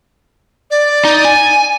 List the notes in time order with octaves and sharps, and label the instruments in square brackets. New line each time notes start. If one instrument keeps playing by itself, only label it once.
[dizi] D5
[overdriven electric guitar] D#4
G#5